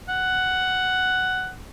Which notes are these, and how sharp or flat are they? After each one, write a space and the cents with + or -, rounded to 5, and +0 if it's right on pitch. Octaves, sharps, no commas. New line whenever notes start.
F#5 +5